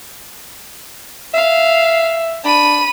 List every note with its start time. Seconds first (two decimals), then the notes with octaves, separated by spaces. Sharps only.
1.34 E5 F5
2.45 D4 B5 D#7